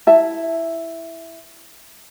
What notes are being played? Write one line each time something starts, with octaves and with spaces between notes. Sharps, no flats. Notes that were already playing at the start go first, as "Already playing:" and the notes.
E4 E5 A5